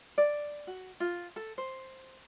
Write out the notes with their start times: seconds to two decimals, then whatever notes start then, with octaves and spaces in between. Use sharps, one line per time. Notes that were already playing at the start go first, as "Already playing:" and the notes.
0.18 D5
0.67 F#4
1.00 F4
1.36 A4
1.58 C5